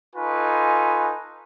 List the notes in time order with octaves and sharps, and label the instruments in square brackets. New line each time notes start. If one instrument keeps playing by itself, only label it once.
[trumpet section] D#4 F4 A4 B4 G#5 C#6